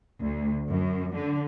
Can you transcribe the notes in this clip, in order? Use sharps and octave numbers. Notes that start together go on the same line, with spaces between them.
D2
F#2
D3